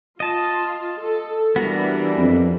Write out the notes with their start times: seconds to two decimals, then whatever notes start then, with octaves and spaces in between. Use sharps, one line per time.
0.20 F4 D#5 A5
1.01 A4
1.56 E3 G3 B3 D4 F#4 A#4
2.18 F2